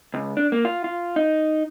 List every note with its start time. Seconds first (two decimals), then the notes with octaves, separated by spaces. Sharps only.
0.14 C#2
0.37 D4
0.52 A#3
0.65 F4
0.84 F4
1.16 D#4